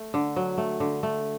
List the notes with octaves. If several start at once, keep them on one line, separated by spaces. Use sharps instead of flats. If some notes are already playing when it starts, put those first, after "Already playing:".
Already playing: A3
D3
F#3
A3
D3
A3